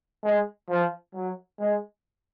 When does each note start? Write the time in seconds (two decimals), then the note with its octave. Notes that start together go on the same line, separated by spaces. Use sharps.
0.24 G#3
0.69 F3
1.15 F#3
1.60 G#3